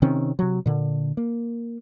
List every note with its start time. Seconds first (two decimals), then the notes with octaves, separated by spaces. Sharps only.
0.02 C3 D#3 C4 C#4
0.39 C3 F#3
0.66 A#2 D3
1.17 A#3